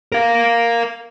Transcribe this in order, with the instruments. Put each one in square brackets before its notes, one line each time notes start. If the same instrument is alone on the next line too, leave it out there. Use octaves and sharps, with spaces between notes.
[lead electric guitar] A#4 F5